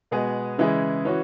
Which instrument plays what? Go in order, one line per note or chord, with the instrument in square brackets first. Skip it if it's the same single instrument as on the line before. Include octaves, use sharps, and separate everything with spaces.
[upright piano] B2 G#3 B3 G#4
C#3 E3 G#3 E4 G#4
E3 C#4 F#4